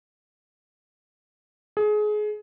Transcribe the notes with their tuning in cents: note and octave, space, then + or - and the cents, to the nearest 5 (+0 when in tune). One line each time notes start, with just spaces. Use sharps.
G#4 +25